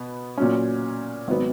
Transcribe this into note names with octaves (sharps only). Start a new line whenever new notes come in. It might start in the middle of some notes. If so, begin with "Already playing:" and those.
Already playing: B2 B3
A#2 F#3 C#4
G#1 F#3 B3